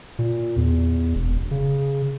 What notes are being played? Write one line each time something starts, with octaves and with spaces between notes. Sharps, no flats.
A#2
E2
E1
C#3